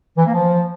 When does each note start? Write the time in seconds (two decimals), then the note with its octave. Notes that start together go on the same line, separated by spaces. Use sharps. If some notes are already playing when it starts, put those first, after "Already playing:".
0.17 E3
0.25 A#3
0.33 F3